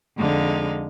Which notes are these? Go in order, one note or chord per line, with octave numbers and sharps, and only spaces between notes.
F2 D3 G#3 D#4 F5